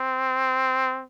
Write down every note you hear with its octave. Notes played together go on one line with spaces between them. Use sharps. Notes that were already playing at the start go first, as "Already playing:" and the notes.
Already playing: C4